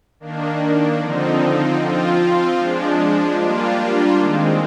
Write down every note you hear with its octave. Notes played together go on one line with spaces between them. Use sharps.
D#3 A#3 D4
D3 F3 C4 D#4
F3 C4 F4
F3 G#3 D4
G3 A#3 D4 F4
D#3 G#3 C4